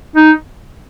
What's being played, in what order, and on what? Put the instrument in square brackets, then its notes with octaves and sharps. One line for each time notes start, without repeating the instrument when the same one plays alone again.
[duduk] D#4